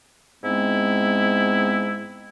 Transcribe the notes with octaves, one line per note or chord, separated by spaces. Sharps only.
G#2 G#3 B3 C4 E4